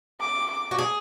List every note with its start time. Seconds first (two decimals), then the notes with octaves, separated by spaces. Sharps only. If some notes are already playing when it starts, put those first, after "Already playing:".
0.20 D6
0.50 D6
0.71 F#4
0.78 G#4